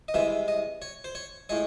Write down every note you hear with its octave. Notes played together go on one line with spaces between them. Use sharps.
D#5
C2 C3 E3 G#3 E5
D#5
C#5
C5
C#5
A2 G#3 C#5